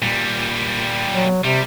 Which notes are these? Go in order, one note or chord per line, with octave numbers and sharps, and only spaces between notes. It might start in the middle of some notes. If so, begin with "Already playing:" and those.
A#2 G3
F#3
C3 G3